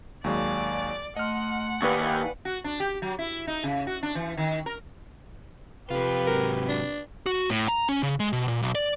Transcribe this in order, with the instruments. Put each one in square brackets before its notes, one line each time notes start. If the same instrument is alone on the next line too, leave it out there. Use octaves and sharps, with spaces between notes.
[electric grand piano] D#2 F#3 G#3 [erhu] D5 [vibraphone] F5 G#5 C#6
[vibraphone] A3 C6 [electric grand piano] D#5 F6 [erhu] F#5
[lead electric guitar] D#2 [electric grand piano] B4 D5 C#6 [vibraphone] F5 G5 G#5
[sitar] F#4
D4
G4
F#3
E4
D#4
C#3
F#4
D4
E3
D#3
A#4
[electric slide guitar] F2 F4 [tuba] C3 [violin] G4 B4
[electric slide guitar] G#2 F#3 [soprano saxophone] A#4
[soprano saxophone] D4
[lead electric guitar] F#4
A2
A#5
C#4
C#3
G#3
B2
A#2
B1
D5